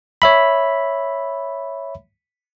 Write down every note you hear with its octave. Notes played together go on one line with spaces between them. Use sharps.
C#5 E5 B5